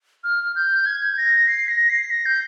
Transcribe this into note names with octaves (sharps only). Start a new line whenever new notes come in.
F6
G6
G#6
A#6
C7
A#6
C7
A#6
G6